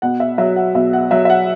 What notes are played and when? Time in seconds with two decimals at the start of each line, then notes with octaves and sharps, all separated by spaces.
0.02 B2 F#5
0.20 E5
0.38 F#3 E5
0.56 F#5
0.74 B2 E5
0.93 F#5
1.11 F#3 E5
1.25 E5
1.30 F#5